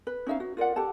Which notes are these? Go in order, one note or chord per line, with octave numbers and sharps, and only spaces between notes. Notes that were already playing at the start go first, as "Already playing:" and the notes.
B4
C#4 D#4 E5 F5
F#4
F4 A#4 D5 F#5
G4 A4 F#5 A5